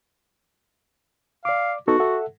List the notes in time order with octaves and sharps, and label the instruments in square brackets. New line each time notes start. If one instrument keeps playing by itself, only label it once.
[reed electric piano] D5 D6 [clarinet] F5
[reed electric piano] B3 D#4 A4 [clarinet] F#4
[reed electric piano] A4 E5 F#5